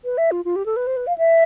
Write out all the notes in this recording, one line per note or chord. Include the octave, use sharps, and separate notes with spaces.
B4
E5
F4
F4
G4
A4
B4
C5
B4
F5
E5